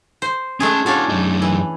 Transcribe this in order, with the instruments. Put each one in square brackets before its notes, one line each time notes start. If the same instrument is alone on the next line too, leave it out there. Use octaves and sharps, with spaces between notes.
[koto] C5
[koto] G#3 A3 G#4 [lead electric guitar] C#4 A5
[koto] C#4 D4 F5 [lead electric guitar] E4 F#4
[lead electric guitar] F#2 D#4
[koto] E3